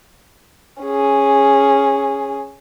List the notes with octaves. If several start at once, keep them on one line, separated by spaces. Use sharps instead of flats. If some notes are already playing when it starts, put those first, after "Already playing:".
C#4 G#4